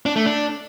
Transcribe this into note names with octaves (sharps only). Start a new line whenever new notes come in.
D4
A3
D4